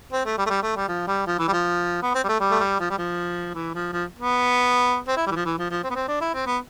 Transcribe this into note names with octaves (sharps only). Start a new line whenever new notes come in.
C4
A3
G3
A3
G3
A3
G3
F3
G3
F3
E3
G3
F3
B3
C4
G3
A3
G3
A3
G3
F3
G3
F3
E3
F3
F3
B3
C4
E4
G3
E3
F3
E3
F3
F3
C4
B3
C4
D4
E4
C4
B3